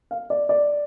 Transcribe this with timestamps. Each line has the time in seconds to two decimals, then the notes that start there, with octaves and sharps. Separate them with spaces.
0.11 F5
0.30 D5
0.49 D5